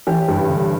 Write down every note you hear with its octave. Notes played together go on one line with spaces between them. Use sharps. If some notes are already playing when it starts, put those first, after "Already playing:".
A1 G4
G2
D3